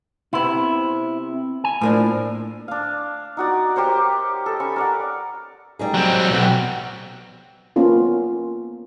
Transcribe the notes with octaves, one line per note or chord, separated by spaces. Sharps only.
C3 B3 E4
G#5
A2 F3 A#3 D4
D4 F5
D#4 F#4 D5
G4 A#4 C5 C#5
A4 D#5
C#4 B5 C#6
A#4 D5 F#5
G3 D#4 G#4
F#3 C4
B1 F#4 G4
A#3 B3 C#4 F4 A4